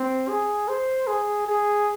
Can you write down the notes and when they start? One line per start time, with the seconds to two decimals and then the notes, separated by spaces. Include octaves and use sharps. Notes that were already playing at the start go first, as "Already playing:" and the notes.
Already playing: C4
0.29 G#4
0.68 C5
1.07 G#4
1.47 G#4